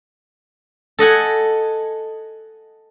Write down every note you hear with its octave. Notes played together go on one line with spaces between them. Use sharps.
A4 D#5 F#5 G#5